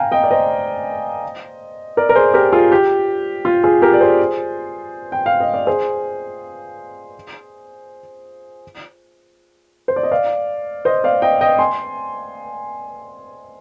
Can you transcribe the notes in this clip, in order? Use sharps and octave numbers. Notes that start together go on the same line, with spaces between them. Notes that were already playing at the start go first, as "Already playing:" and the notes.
Already playing: F5 G5 G#5 A#5
D#5 G5
D5
C5 D#5
A#4 D5
A#4
G#4 C5
G4 A#4
F4 G#4
G4
F4
F4 G#4
G4 A#4
D5
G#4 C5
G5
F5
D#5
D5
G#4 C5
C5
D5
D#5
D5 F5
C5 D#5
D5 F5
D#5 G5
D#5 G5
G#5 C6